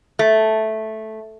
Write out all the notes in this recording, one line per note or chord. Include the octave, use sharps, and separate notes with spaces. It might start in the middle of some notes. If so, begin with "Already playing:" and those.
A3